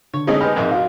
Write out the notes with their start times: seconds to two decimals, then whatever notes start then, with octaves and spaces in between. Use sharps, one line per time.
0.14 D3 C#5
0.27 G#3 A3 C4 C#4 D#4
0.41 B3 G4 G#5 B5 F6
0.56 A#1 F2 G#2 A#4 E5
0.72 F#4 F5